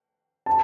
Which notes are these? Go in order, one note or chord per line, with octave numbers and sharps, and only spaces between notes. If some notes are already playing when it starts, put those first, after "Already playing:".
A5